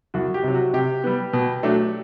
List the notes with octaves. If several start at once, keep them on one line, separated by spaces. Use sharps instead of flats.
C2 F#4
G4
C3 F#3
F#4
C3 G4
G3 B3
B2
F#3 A3 D4